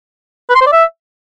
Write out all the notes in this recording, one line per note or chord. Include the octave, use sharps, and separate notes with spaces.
B4
C6
C5
D5
E5